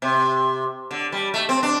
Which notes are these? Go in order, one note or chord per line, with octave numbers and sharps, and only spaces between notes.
C3
D3
G3
A3
C4
D4